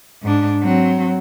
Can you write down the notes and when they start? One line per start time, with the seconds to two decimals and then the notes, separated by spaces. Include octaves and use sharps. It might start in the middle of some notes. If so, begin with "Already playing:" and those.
0.22 G#2 D4
0.62 F#3 C4